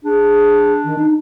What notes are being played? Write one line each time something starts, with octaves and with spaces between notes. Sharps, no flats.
D4 G#4
D#3
D#4